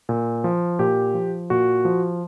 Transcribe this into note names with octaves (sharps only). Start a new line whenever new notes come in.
A#2
F3
A#2 G4
F3
A#2 F#4
F3